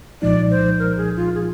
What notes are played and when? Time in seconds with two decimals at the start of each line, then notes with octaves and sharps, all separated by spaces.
0.22 C2 A#2 F3 G#3 D#4 D5
0.51 C5
0.79 A#4
0.97 G#4
1.16 F4
1.35 G#4